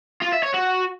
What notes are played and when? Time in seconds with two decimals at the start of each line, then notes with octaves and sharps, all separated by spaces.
0.22 F4
0.33 E5
0.43 C#5
0.54 F#4